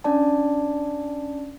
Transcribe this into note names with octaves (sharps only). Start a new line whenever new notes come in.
C#4 D4 D5 A5